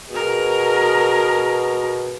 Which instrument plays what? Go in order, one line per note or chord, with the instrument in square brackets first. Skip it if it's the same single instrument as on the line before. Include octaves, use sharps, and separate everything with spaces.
[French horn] B2 [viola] G#4 A#4